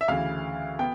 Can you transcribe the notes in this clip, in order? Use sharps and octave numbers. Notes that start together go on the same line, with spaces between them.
E5
D2 C#3 E3 F5
B3 G5